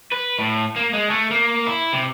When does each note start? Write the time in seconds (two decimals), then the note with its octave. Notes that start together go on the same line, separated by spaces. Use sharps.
0.12 B4
0.39 A2
0.76 A#3
0.93 G#3
1.10 A3
1.31 A#3
1.67 E4
1.93 C3